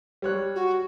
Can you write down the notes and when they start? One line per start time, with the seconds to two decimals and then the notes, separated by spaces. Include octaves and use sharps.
0.22 G3 C#5 F#6
0.55 F#4